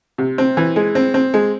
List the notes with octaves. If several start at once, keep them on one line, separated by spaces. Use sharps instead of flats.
C3
C4
E3
G#3
C4
C4
G#3